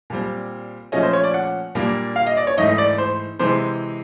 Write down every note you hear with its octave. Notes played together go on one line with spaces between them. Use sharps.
A#2 G3 C4
A#2 F3 A3 C#4 D#5
C5
C#5
D5
F#5
A#2 G3 A#3 D4
F5
D#5
D5
C#5
G#2 E3 A3 D#5
D5
C5
C3 E3 G#3 C5